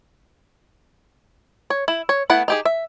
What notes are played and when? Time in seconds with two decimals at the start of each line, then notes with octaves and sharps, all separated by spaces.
1.70 C#5
1.88 E4
2.09 C#5
2.30 A3 B3 E4 F#5
2.48 D#4 G4 G#4
2.65 E5